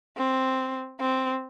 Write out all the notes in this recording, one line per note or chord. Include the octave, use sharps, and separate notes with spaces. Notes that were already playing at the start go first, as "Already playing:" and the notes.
C4
C4